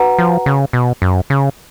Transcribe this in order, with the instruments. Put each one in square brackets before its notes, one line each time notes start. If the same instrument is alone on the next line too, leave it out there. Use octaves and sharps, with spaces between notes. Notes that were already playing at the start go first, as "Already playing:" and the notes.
Already playing: [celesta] F#4 B4 F#5 A#5
[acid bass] F3
C#3
B2
F#2
C#3